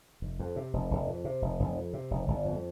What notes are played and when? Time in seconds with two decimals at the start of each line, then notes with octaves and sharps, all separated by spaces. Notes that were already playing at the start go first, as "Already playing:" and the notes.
0.22 F1
0.39 F2
0.56 C3
0.73 F1
0.91 F1
1.07 F2
1.25 C3
1.42 F1
1.60 F1
1.76 F2
1.93 C3
2.11 F1
2.28 G1
2.45 F2